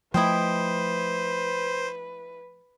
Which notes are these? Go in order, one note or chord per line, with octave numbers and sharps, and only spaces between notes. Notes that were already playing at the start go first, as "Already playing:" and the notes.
F3 A3 E4 B4 C5 D#5 G5